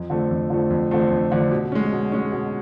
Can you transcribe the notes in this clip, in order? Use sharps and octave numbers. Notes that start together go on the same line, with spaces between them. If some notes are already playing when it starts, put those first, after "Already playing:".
Already playing: F2
D3 F3 A3 C4
F2
D3 F3 A3 C4
F2
D3 F3 A3 C4
F2
D3 F3 A3 C4
B2
G#3 C#4
B2
G#3 C#4
B2